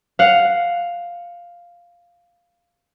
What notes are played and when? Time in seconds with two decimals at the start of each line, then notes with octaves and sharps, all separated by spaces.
0.19 F5 F#5